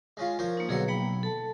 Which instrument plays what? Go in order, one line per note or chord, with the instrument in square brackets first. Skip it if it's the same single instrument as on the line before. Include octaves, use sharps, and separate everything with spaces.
[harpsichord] G#3 C#4 F4
[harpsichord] F3 C5 C#5 [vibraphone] A#4
[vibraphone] A#3 D#4
[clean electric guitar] B1 [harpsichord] D3 F#3 C6 [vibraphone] G#4 B4 C#5
[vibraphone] A#3 G5 A#5 [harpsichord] B5
[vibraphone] A4 A5